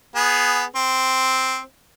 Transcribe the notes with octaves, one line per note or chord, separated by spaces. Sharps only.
B3 G#4
C4